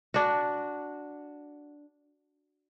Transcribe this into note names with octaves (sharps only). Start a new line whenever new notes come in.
D4 F#4